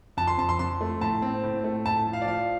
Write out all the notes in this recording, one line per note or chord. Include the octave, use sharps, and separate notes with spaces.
F2 A5
C6
F2 A5
C6
F2 C6
A3
A2 A5
C4
A2
A3
A2 A5
F3
F5
D5
F3 F5